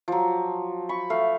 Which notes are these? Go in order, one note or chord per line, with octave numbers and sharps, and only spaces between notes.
F3 F#3
B5 C#6
A3 F5